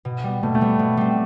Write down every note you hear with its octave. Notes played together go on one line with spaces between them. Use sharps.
B2
G3 B3
B2 A3
A3
G3 B3
B2
G3 C4